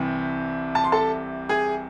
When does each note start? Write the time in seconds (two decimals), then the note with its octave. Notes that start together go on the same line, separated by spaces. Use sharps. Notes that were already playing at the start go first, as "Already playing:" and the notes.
Already playing: C2 C3 E3 C4
0.75 A5
0.84 C6
0.92 A4 A5
1.49 G#4 G#5